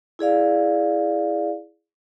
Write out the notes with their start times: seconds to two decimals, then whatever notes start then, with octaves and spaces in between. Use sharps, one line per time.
0.19 E4 G#4 D5 F5